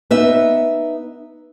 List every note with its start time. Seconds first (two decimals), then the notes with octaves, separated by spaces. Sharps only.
0.11 B3 D#4 E5